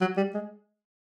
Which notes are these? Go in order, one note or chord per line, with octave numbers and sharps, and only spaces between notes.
F#3
G3
G#3